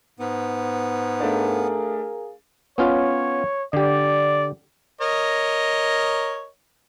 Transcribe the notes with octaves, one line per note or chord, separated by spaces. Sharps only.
G#2 B3
A3 D4 G#4 A#4 D5 F5
B3 C#4 F4 C#5
D3 G4 D5
A#4 C#5 D#5